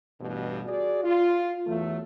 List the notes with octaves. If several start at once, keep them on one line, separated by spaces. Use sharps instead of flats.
A1 G2 B2
F#4 G#4 D5
F4
E2 E3 F#3 A3